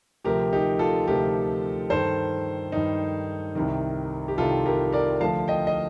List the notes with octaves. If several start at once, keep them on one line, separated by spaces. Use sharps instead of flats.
D2 C3 F3 G4 A#4
D#4 G4
F4 A4
D2 C3 F3 G4 A#4
G2 D#3 A4 C5
G2 D#3 D#4
C2 C3 D#3
G4
C2 C3 D#3 F4 A4
G4 A#4
A#4 D5
D2 D3 F3 F5 A5
D#5 G5
D#5